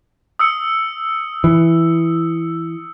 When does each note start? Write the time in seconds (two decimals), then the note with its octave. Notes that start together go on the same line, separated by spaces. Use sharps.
0.39 D#6 E6 C#7
1.44 E3